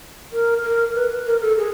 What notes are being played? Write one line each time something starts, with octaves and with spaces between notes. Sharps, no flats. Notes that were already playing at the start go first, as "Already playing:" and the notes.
A#4
A#4
B4
A#4
A4
G#4